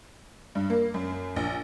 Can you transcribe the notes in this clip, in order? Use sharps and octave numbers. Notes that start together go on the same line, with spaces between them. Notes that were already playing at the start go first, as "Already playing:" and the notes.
G2
A#3
F#2
A#1